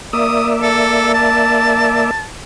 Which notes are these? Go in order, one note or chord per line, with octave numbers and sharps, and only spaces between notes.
A#3 D5 E5 D#6
A4
A5